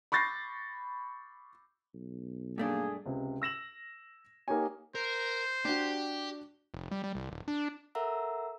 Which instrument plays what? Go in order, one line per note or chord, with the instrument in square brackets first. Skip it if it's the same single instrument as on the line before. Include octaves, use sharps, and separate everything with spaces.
[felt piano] B5 C#6 G6 A6 A#6 C7
[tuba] B1
[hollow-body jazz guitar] G2 A3 D4 [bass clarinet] A#3 [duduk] G#4
[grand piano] C#2 C3
E6 A#6 E7 F#7
A#3 D#4 G4 C#5 G#5
[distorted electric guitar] A#4 [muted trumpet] C5
[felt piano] D4 F#4 [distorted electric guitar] G4
[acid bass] F1
G3
G3
C2
D#1
D4
[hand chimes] A4 A#4 E5 F#5 A#5 E6